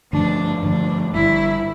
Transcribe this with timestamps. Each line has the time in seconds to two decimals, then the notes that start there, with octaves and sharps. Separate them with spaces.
0.12 G2 D3 F3 A3 D4
0.63 G2 D3 F3 A3 D4
1.14 G1 G2 D3 E4